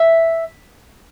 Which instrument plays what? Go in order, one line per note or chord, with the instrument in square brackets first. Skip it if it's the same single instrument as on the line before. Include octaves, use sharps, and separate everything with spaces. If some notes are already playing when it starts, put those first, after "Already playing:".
Already playing: [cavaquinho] E5